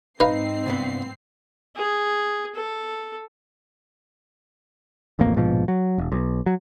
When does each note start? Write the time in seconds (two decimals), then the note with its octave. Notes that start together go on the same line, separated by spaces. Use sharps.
0.20 G#2 C4 D#4 B4 F5 C7
0.66 C2 G2 B3
1.76 G#4
2.55 A4
5.19 D1 A1 F2 A#3
5.36 A#1 G#2 B2 F3
5.68 F#3
5.98 E1
6.12 B1
6.46 F#3